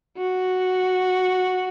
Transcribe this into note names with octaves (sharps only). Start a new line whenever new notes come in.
F#4